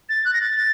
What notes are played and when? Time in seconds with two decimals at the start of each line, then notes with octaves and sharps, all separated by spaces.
0.09 A6
0.25 F#6
0.33 A#6
0.41 A6
0.57 A6